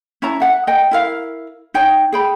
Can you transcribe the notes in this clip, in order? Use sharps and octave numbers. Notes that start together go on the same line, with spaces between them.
C#4 E4 A5 A#5
E5 F#5
D#5 G5
E4 A#4 F5
D#4 C#5 G5
G#4 G5 B5